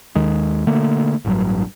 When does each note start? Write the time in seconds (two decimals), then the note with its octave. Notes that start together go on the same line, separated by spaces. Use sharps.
0.15 D#2 D#3 G#3
0.67 B2 D3 A3 A#3
1.25 A1 D2 G2 F#3